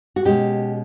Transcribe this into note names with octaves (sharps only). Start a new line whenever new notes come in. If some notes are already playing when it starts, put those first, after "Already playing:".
F#4
B2 G#3 C#4 G4